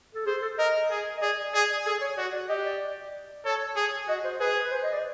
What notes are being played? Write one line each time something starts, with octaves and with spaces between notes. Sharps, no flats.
A4
G#4 C5
A4
A#4 D#5
G#4
D#5
G#4 D5
G#4 D5
G#4 A4
C#5
F#4 D5
D5
G4 D#5
D5
A4 C#5
G#4
F#4 D#5
C5
G#4 B4
B4
C5
D#5
D5